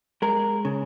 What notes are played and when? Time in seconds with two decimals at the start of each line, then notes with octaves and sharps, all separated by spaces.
0.22 G#3 A#4
0.65 C#3